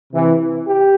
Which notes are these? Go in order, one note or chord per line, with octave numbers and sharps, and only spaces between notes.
C3 E3
G4